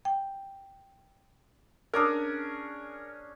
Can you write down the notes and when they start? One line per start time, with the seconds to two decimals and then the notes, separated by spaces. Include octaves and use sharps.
0.05 G5
1.94 C#4 D4 G#4 A#4